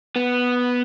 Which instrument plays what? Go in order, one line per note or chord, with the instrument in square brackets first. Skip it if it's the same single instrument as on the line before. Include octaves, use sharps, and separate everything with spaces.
[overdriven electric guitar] B3